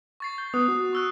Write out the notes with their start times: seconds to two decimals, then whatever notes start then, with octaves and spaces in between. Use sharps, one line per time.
0.20 C#6 A6 C7
0.38 G6
0.54 B3 D#6 F#6
0.68 F#4
0.93 C#6 E6 F#6